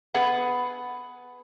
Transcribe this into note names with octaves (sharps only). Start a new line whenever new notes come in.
B3 G#4 B4 F#5